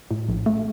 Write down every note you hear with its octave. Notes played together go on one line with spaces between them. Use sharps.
A2
A#1
A3